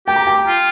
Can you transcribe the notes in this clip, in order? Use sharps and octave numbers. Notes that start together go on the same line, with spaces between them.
G4 G5
A#5
G5
F4